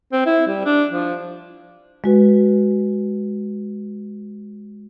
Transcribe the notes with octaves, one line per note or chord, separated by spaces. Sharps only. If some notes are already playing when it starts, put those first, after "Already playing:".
C4
E4
G3
D4
F3
G#3 F#4 B4